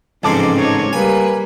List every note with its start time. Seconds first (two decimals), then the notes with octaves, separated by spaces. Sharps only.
0.23 A1 G#2 C#3 F3 C4 D#4 A5 D6
0.58 D#4 C#5
0.93 G3 A#3 B4 G#5